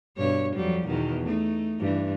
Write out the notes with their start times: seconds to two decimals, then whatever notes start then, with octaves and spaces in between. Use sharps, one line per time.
0.18 G2 B2 C#5
0.56 F2 F#3 G3
0.87 E2 B2 D#3
1.26 A3 D#4
1.80 G2 E3